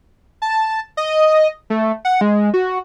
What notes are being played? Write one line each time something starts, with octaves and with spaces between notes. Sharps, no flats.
A5
D#5
A3
F#5
G#3
F#4